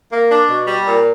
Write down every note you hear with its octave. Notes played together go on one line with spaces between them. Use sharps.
A#3
D4
B2
G3
A#2